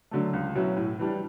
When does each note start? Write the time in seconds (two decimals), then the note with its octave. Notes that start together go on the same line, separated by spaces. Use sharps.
0.11 D3 F#3 A3
0.33 C#2
0.55 B2 F#3 C#4 E4
0.77 A2
0.99 E3 G3 D4